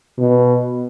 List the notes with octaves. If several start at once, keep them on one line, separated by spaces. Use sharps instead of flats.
B2